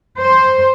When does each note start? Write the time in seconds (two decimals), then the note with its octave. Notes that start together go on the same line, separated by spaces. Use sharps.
0.19 C5